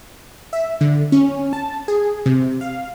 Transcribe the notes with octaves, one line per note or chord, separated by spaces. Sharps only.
E5
D3
C#4
A5
G#4
C3
F5